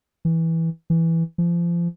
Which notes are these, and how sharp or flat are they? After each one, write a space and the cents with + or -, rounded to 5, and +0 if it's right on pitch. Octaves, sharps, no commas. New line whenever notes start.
E3 -10
E3 +0
F3 -30